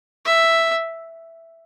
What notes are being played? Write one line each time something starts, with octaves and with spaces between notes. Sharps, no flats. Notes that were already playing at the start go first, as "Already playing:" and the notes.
E5